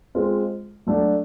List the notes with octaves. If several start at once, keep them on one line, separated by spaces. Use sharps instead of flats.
G#3 C4 F4
F#3 A3 D4 F#4